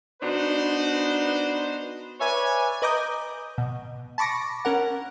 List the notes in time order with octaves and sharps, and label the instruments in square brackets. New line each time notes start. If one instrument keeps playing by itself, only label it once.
[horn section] B3 D4 D#4 F#4 B4 C5
B4 C#5 D5 E5 G#5
[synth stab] B4 D#5 A#5 D6 D#6 G6
B2
A5 B5 C#6 D6 A#6
C#4 A#4 F#5